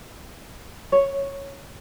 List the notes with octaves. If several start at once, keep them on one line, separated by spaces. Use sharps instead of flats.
C#5